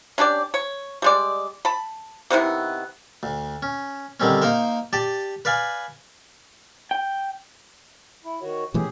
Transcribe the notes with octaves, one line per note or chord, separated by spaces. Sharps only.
C#4 D4 G4 D5
C#5
G3 G#3 D5
A5 B5
C3 D#3 B3 E4
D2
C#4
D3 D#3 G3 C4 C#4
A#3 D#4 A#4 C5
G4 D5 A5
B4 D5 F5 G#5
G5
E4
D#3 F#4 C#5
B2 E3 A3 C#4 G4 G#4